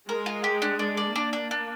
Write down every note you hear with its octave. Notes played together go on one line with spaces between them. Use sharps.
G#3 A#4
F4
G4
D4
D4
D5
A#3 D4
D4
D4